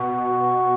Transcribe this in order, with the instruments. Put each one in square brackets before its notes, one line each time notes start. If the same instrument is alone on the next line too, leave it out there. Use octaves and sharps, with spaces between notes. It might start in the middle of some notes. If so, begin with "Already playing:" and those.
Already playing: [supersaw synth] B2 [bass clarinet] F#4